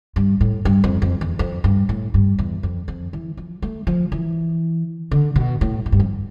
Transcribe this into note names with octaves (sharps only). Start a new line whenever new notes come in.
G2
A2
G2
F2
F2
E2
F2
G2
A2
G2
E2
F2
F2
E3
F3
A3
F3
E3
D3
B2
A2
A2
G2
F2